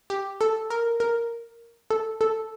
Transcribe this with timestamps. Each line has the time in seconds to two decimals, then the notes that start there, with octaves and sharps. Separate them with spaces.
0.10 G4
0.41 A4
0.70 A#4
1.00 A#4
1.91 A4
2.21 A4